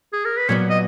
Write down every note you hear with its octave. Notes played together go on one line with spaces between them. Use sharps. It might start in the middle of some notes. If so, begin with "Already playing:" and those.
G#4
A#4
B4
A#2 F#3 B3 C#5
D#5